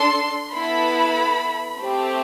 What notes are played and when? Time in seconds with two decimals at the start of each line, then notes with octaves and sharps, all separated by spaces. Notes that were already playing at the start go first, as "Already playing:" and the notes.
Already playing: D4 A4 C6
0.53 B3 E4 A4 B5
1.80 A3 C4 G4